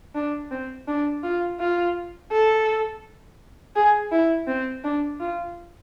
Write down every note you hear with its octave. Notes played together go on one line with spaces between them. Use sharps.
D4
C4
D4
F4
F4
A4
G#4
E4
C4
D4
F4